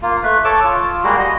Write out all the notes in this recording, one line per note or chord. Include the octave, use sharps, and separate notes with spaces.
A#3 F4
A3 B4
A4 C#5 A5 D6
F4
G3 G#3 A#3 F#4
D#5